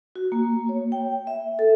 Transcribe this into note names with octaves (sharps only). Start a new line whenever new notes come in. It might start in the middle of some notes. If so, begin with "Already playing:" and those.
F#4
A#3
C#5
G5
E5
A4